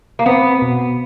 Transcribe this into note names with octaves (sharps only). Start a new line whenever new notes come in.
A#3
B3 C4
B2